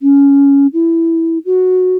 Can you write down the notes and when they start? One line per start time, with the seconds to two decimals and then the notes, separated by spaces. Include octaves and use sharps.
0.02 C#4
0.73 E4
1.46 F#4